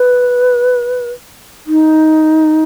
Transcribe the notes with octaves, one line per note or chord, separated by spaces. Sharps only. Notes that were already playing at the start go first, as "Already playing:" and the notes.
Already playing: B4
D#4